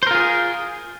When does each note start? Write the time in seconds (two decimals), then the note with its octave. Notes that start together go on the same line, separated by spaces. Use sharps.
0.03 C5
0.07 A#4
0.11 F4
0.15 G#4